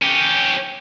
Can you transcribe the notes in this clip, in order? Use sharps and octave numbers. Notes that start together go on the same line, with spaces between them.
C#4 G4